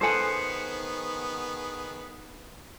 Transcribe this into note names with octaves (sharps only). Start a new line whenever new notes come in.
D#3 B3 G#4 A4 C5 F#5 G#5